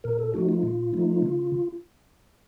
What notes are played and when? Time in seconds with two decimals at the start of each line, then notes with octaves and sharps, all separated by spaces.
0.04 A#2 A#4
0.19 A4
0.34 F3 A3 D#4 F#4
0.49 F4
0.63 A#2
0.93 F3 A3 D#4
1.22 C#3